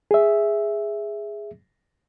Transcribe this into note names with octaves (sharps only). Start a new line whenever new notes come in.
G#4 E5